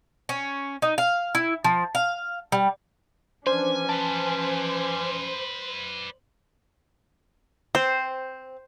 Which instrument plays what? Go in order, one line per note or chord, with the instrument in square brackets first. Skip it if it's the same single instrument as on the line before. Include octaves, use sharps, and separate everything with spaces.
[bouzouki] C#4
D#4
F5
E4
F3
F5
G3
[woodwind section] E3 F3 C#4 [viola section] D4 [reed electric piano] C5 [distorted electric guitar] G#5
[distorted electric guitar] B4 D5 [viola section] C5 [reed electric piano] A5
[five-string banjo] C4 [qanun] C5